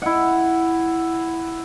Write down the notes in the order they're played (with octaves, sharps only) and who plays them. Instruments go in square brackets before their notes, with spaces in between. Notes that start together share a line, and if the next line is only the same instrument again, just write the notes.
[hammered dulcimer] E4 F#5